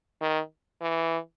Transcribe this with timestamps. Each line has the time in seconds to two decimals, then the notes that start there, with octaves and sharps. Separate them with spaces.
0.22 D#3
0.82 E3